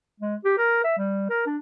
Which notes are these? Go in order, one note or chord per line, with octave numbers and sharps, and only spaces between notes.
G#3
G4
A#4
E5
G3
A#4
D4